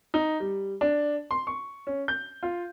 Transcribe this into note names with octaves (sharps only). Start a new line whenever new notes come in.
D#4
G3
D4
C6
C#6
C#4
G6
F4